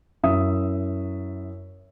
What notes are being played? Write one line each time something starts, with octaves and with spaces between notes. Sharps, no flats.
F#2 E4 E5 D#6